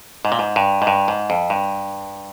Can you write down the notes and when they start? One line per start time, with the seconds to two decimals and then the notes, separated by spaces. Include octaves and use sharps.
0.25 G#2
0.32 A#2
0.39 G#2
0.56 G2
0.82 G#2
0.87 G2
1.08 G#2
1.30 F2
1.50 G2